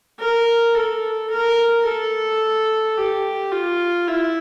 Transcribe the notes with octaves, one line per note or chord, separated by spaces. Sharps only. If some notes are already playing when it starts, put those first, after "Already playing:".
A#4
A4
A#4
A4
G4
F4
E4